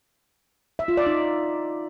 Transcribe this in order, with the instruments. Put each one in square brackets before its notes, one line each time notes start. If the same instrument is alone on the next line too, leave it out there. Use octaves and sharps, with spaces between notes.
[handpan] E5
F4
D5
D#4